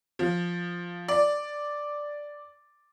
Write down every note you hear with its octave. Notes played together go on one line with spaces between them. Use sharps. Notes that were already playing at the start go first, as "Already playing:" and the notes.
F3
D5